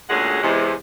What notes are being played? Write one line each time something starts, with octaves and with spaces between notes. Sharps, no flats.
D2 A#2 G#3 C#4 G#4 F#5
E2 C3 G#3